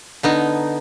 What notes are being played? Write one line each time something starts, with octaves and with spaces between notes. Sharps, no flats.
D3 B3 D#4